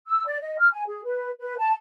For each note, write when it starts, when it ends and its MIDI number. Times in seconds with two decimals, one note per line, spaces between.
0.07 0.24 88
0.26 0.37 74
0.41 0.57 75
0.59 0.69 89
0.72 0.83 80
0.87 1.01 68
1.05 1.31 71
1.40 1.55 71
1.58 1.72 81